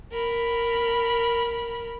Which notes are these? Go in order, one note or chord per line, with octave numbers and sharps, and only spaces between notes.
A#4 B5